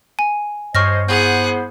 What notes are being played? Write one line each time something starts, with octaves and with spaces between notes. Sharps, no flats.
G#5
G2 C5 C#5 D#5 C#6 F6 A#6
B3 E4 G#4 C5 F#5